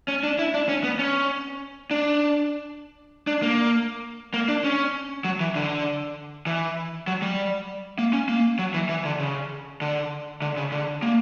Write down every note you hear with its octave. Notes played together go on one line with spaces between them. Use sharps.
C#4
D4
E4
D4
C#4
B3
C#4
D4
D4
A#3
A#3
D4
C#4
F#3
E3
D3
E3
F#3
G3
A#3
C#4
A#3
F#3
E3
E3
D3
C#3
D3
D3
C#3
D3
A#3